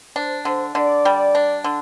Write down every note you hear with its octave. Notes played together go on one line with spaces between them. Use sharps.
D4 C5
D3 C5
D3 D5
G3
D4
D3